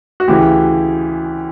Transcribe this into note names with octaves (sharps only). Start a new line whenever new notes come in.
F#4
D2 C#3 E3 G4